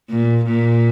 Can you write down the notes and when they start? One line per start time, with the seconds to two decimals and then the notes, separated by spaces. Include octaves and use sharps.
0.10 A#2
0.46 A#2